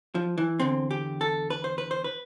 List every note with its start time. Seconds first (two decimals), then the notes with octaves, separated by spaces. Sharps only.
0.15 F3
0.38 E3
0.60 E2 D3 C4
0.91 G4
1.21 A4
1.50 B4
1.64 C5
1.78 B4
1.91 C5
2.04 B4